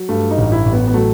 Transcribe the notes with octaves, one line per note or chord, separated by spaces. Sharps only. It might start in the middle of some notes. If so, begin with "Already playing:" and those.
Already playing: F#3
G2 A3
D#4
A1
E4
A1
B3
B3
F#3 A3